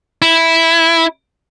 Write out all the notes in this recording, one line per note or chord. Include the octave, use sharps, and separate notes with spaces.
E4